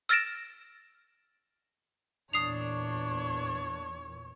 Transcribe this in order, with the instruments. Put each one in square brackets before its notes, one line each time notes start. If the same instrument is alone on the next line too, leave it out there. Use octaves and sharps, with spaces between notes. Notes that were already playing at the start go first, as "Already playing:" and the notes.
[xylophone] E6 F6 A6 A#6 D7 E7
[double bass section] E2 A#2 [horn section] D4 [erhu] C#5 [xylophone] D#6 C7 F7